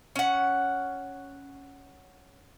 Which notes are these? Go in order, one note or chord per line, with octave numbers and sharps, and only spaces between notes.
C#4 F#5